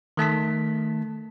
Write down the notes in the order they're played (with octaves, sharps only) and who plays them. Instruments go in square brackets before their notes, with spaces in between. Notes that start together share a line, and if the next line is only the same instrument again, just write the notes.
[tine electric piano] D#3 A3 A5 B6